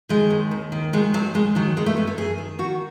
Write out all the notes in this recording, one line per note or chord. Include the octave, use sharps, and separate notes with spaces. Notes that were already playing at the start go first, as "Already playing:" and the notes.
D#3 G#3
D#2
D#2
D#3
D#3 G#3
D#2 F#3
D#2 G#3
D#3 F#3
D#3 G#3
A3
F#2 B3
A3
F#2 G#4
D#3
D#3 F#4